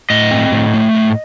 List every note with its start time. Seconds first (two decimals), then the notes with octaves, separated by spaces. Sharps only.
0.10 A2 D#5
0.31 C4
0.52 A2
0.74 A3
0.95 A2